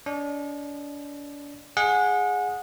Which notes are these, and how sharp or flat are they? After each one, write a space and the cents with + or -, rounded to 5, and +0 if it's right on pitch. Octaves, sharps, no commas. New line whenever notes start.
D4 -40 D#5 -45
G#4 +0 D#5 +0 F#5 -25